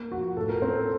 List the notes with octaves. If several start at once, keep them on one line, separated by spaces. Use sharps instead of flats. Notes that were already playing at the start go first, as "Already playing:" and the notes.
Already playing: A#3
F3 F#4
A2 A4
A#4
C4 C5
A4